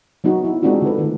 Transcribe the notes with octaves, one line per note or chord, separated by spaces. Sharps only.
F#3 B3 D#4 F#4
E4
G#3 C4 D4 D#4 F4 F#4
D3 D#4 A4 B4
D#3 A3